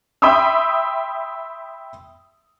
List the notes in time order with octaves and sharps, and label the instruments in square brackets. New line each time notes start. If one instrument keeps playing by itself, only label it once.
[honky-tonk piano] E5 G5 B5 C6 D#6 E6